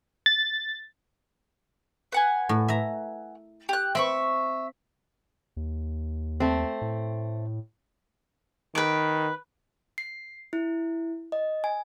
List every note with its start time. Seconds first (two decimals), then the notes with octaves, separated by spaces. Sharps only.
0.26 A6
2.12 B4 F#5 G#5
2.49 A2
2.68 E5 A#5
3.69 G4 F#6
3.95 C4 E5 B5 C#6
5.57 D#2
6.40 A3 C4
6.82 A2
8.75 D#3 B4 D6
9.98 C7
10.53 E4
11.32 D#5
11.64 G#5